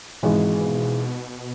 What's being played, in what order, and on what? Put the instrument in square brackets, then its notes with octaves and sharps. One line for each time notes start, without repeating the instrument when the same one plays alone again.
[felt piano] G#1 G#2 E3 G#3 [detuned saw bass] B2